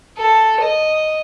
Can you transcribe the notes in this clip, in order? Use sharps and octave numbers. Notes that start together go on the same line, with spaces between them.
A4
D#5